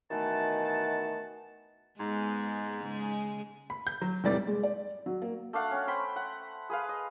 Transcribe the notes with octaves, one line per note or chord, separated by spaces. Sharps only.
B2 D#3 E3 A3 F#5 A5
G#2 G#3 B3
C#3 G#3 G#4
B5
G6
F#3
F1 A2 G3 D5 A6
G#3
D5
F#3
A#3
A3 D4 F5 F#5
C#4 F#5
C5 G5 B5
F#5
G#4 B4 F5
D#5